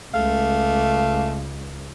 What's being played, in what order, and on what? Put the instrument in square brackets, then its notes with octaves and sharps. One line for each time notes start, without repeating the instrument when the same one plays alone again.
[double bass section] C#2 [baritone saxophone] A3 [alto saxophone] F5